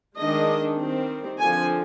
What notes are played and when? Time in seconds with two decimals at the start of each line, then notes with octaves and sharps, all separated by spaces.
0.18 D#3 G#3 D4 D#5
0.79 D#3 G3 C4
1.39 D3 F3 C4 G#5